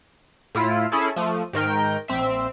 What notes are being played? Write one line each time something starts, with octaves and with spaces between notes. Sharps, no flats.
A2 E4 F4
C#4 E4 G#4 A4
F3 A3 D#7
G#2 D#3 A#4 G5
A#1 C4 E5